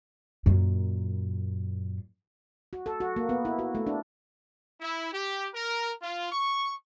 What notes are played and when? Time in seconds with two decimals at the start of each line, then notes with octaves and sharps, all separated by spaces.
0.46 F#2 A#2
2.73 F#4
2.86 A4
3.00 F#4
3.16 A#3
3.29 B3
3.45 E4
3.59 F#4
3.75 A3
3.87 D4
4.81 E4
5.13 G4
5.54 A#4
6.02 F4
6.32 C#6